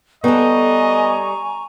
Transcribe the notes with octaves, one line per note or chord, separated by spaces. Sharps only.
G3 B3 A4 D#5 G#5 A#5 C#6